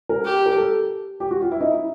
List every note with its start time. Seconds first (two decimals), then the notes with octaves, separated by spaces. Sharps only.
0.09 A#4
0.25 G4
0.46 A#4
0.57 A4
1.20 G4
1.31 F#4
1.41 F4
1.51 E4
1.61 D#4
1.70 E4